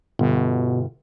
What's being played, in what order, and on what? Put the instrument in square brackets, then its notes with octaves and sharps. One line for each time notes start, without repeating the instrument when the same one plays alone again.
[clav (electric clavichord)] G1 [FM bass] B2